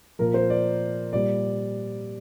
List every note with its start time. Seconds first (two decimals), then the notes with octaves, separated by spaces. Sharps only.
0.19 A#2 F3 A#4
0.34 C5
0.50 D5
1.13 A#2 G3 D5